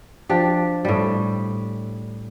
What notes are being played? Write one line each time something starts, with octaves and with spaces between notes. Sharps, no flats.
F3 D4 G4
A2 G3